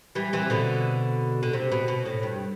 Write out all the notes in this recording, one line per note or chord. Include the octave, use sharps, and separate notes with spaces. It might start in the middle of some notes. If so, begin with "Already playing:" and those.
E3 G3
C3 E3
B2 D3
D3
C3
B2
B2
A2
G2